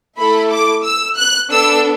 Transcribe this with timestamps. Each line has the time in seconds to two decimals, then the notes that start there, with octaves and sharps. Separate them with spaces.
0.18 A3 E4 A4 B5
0.51 D6
0.84 E6
1.17 F#6
1.51 B3 D4 A4 E6